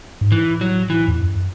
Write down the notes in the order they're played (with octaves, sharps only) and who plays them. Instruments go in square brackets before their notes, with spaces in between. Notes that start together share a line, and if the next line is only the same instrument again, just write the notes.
[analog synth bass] G#2
[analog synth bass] A2 [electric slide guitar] E3
[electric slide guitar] F#3
E3
[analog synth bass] E2
F#2